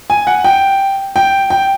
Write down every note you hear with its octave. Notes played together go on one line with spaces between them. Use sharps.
G#5
F#5
G5
G5
G5